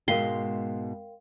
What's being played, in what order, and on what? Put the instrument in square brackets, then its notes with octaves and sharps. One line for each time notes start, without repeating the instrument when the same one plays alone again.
[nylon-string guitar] G#2 B2 G#3 [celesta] A#4 F5 G5 [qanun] C6